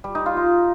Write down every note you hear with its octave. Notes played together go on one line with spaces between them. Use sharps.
G3
D#4
F4
F4